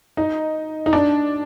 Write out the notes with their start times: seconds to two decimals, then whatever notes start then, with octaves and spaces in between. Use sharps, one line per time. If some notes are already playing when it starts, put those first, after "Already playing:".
0.17 D#4
0.86 D#4
0.93 D4